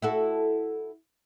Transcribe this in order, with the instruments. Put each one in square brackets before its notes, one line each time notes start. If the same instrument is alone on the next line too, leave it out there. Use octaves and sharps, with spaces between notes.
[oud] E4 F#4 A4